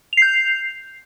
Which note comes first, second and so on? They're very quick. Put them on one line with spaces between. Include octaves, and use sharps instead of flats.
F7 C7 G6